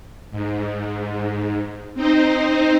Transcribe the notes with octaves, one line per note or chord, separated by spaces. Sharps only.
G#2
C4 D#4 C5